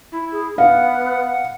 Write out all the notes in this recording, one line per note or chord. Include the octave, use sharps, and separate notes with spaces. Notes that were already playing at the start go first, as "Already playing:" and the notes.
E4
G#4
B3 F5 F#5